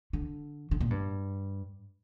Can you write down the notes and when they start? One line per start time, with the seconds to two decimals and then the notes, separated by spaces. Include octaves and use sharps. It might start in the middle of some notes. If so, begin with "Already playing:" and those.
0.13 D3
0.71 D3
0.81 A#2
0.91 G2